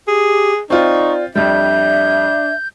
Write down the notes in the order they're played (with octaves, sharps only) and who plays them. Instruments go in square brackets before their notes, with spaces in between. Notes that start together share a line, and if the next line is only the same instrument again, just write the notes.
[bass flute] G4 [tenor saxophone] G#4
[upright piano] C4 F4 [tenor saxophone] D#4 [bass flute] D5 [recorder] C#6
[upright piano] F2 G3 [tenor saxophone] D4 [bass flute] E5 [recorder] G6